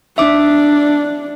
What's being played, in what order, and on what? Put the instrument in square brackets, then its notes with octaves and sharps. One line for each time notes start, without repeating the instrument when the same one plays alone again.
[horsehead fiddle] D4 [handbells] E5 D6